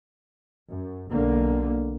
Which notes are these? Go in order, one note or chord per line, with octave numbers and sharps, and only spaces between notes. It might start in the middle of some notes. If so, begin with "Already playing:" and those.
F#2
B1 D3 A#3